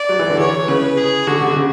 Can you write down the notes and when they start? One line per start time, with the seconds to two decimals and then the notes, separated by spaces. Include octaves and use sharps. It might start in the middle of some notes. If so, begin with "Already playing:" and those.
Already playing: D5
0.09 F#3
0.19 E3
0.30 D3
0.39 E3 C#5
0.68 C#3 B4
0.97 G#4
1.27 D3 F#4
1.43 D3
1.56 C#3